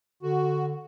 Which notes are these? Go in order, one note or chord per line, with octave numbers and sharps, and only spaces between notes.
D3 F#4